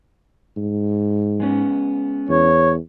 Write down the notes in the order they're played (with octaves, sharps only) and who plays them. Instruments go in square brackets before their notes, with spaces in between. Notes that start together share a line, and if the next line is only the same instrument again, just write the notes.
[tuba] G#2
[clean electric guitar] G#3 B3 C#4
[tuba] E2 [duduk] C#5